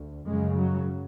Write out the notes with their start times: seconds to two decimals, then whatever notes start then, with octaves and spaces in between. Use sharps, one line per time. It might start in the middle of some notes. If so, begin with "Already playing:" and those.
Already playing: D2
0.27 F#2 C#3 G#3
0.57 F#3